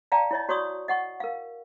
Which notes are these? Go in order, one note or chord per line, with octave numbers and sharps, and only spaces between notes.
D5 F5 G5 A5 A#5
E4 C#5 D#5
F#4 C#5 D5 B5 C#6 D#6
D#5 F#5 C#6
A#4 F5